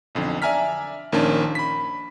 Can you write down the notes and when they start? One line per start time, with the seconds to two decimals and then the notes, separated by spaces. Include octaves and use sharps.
0.15 B1 F2 D3
0.42 D5 E5 G#5 A#5 F6 B6
1.12 A#1 D#3 A#3 C#4 D4 A5
1.55 B5 B6